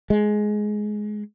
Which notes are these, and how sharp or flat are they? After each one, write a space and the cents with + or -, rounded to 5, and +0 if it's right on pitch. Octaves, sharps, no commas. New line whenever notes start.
G#3 +15